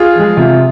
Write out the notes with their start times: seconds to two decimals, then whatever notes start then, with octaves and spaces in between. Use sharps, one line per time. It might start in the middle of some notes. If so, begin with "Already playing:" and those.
Already playing: F4 G#4
0.16 F3 G#3
0.37 C3 F4